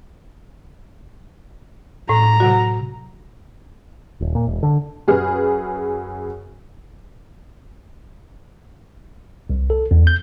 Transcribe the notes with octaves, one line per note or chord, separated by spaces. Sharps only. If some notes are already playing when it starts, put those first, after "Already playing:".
A2 A#5
C3 F#3 F#4
D#1
A#2
E1
D3
F#2 G#4 B4 F6
C2
A4
E2
G6